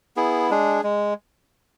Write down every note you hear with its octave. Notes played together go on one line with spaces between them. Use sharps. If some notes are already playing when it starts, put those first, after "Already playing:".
B3 E4 G#4
G#3 D4 G#4
G#3